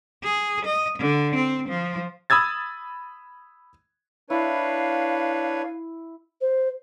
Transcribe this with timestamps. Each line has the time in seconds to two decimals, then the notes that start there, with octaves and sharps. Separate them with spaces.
0.23 G#4
0.65 D#5
0.99 D3
1.35 C4
1.69 F3
2.30 B5 D#6 E6 G#6 A6
4.30 D4 E4 B4 C#5 F5
6.41 C5